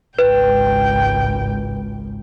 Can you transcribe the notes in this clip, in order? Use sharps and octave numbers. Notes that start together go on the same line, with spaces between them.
G#1 C#2 B4 G5